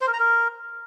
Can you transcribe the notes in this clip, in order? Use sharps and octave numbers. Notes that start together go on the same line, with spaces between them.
C5
A#4
A#5
A#4